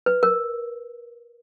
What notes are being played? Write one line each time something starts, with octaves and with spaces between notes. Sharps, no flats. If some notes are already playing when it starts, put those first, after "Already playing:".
B4
A#4